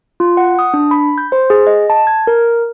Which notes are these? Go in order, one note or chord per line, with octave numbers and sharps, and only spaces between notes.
F4
F#5
D#6
D4
B5
G6
C5
G#4
D#5
A5
G#6
A#4